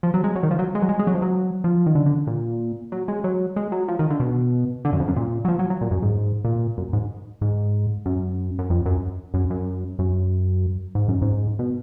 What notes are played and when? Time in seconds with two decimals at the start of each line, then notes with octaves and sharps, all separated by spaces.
0.03 F3
0.14 F#3
0.24 G#3
0.36 F#3
0.43 D#3
0.51 F3
0.59 F#3
0.75 G#3
0.82 F#3
0.89 G#3
0.99 G#3
1.07 F#3
1.15 F3
1.22 F#3
1.64 F3
1.86 D#3
1.95 D3
2.06 D3
2.27 A#2
2.92 F#3
3.08 G#3
3.24 F#3
3.56 G#3
3.72 F#3
3.88 F3
3.99 D#3
4.10 D3
4.20 B2
4.85 D3
4.93 F#2
5.00 F2
5.08 F#2
5.16 A#2
5.45 F#3
5.48 F3
5.59 F#3
5.70 F#3
5.81 A#2
5.91 F#2
6.02 G#2
6.45 A#2
6.78 F#2
6.93 G#2
7.41 G#2
8.06 F#2
8.58 F#2
8.70 F2
8.86 F#2
9.34 F#2
9.50 F#2
9.99 F#2
10.95 G#2
11.08 F#2
11.22 G#2
11.59 B2